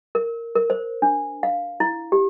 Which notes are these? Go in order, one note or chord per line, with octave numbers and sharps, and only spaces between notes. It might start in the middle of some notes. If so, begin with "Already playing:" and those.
A#4
A#4
C5
D4
F5
E4
G4